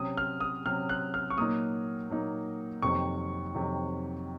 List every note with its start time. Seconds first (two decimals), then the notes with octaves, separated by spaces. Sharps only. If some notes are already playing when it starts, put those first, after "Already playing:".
Already playing: C3 F#3 C#4 D#6
0.17 F6
0.41 D#6
0.66 C3 F#3 C#4 F6
0.89 F#6
1.14 F6
1.30 C#6
1.37 A#2 F#3 A#3 D#4 D#6
2.10 A#2 F#3 A#3 D#4
2.82 F2 C3 D#3 F#3 C#6
3.54 F2 C3 D#3 F#3